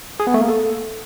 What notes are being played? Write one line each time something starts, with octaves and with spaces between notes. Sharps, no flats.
G#4
B3
A3
A#3
A4